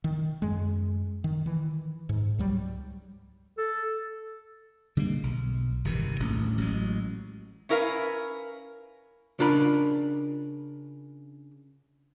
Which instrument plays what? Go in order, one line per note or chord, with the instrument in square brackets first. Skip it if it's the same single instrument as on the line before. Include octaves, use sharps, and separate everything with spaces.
[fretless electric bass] D#3
F#2 G#3
D#3
D#3 E3
G#2
C#2 F#3 G3
[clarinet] A4
[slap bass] D3 G3 G#3 A#3
B1
G1 C3 D#3 E3
D#1 A#1 A2 C#4
A1 F#3 G#3
[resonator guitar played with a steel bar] C#4 E4 A#4 B4 F5
[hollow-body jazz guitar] C#3 D4 F4 A#4 B5